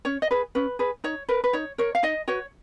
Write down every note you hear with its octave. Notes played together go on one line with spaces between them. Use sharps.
C#4 C#5
D#5
G#4 B4
C#4 B4
G#4 B4
D#4 C#5
A#4 B4
B4
D#4 C#5
A#4 C#5
F5
D#4 D#5
F#4 B4 C#5